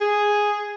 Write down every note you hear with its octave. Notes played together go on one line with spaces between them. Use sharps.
G#4